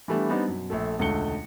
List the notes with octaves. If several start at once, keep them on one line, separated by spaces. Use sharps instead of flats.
E3 G3 A3 B3 D4 G4
G3 B3 C4 D4 D#4
F#2 B2
A#1 A3 A4
E1 C#2 D3 A3 C#7 G7